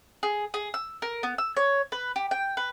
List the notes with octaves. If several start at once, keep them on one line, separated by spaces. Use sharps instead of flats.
G#4
G#4
E6
A#4
B3
E6
C#5
B4
G4
G5
B4